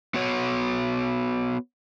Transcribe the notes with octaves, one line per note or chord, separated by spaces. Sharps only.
B3 F#4 C#5